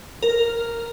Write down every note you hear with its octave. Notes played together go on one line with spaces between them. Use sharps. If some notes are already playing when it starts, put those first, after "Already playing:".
A#4